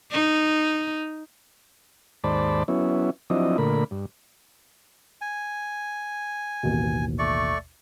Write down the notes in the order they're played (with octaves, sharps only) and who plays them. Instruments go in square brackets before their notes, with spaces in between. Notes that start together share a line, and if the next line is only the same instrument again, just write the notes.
[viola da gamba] D#4
[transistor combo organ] D#2 G#2 C5 D5 A5 B5
F#3 B3 C#4 E4
F3 F#3 C4 D4 E4 D#5
A#2 D3 A3 A#4 B5
G2
[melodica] G#5
[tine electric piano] A1 D#2 B2
[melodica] A3 D5 C#6